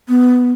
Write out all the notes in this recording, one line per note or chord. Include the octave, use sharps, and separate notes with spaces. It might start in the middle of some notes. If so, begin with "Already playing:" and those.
B3